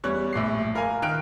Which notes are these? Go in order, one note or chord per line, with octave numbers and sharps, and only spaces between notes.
E2 G3 C#5 F#6
A#1 A2 D6 C7
F4 A#4 F5 G#5
D#3 G5 F6 F#6 D7